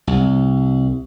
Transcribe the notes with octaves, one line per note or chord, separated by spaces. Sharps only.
C2